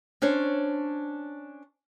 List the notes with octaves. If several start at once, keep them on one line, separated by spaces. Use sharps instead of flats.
C#4 D4 C5 C#5